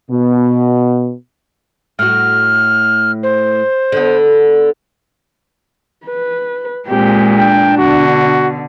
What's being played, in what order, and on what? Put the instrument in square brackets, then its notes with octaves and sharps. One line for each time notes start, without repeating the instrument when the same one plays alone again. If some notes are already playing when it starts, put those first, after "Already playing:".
[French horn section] B2
[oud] A2 F#4 [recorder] F6
[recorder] C5
[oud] D3 B3
[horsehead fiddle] B4
[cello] A#2 G#3 [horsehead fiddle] C4 G4
[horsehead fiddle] D4 [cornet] G5
[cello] B2 D3 [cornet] F#4